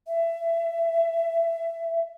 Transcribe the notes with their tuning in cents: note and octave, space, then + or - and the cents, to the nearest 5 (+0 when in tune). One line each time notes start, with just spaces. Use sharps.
E5 +20